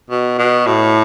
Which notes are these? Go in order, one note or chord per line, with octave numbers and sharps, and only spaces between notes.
B2
B2
A2